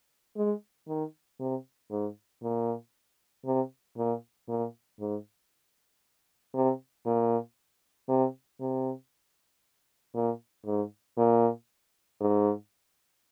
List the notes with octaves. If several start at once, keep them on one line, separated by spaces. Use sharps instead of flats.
G#3
D#3
C3
G#2
A#2
C3
A#2
A#2
G#2
C3
A#2
C3
C3
A#2
G#2
A#2
G#2